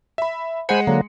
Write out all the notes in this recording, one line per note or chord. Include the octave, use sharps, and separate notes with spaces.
E5 B5
G#3 C5 F#5 G#5 B5 C#7
D3 F#3 A#3